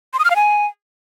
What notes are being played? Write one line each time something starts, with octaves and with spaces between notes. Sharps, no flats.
C6
D#6
F6
F5
G#5